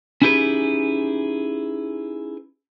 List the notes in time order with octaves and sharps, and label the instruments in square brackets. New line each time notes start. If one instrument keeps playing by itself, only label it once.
[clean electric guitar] C#4 D#4 E4 G4 G#4 B4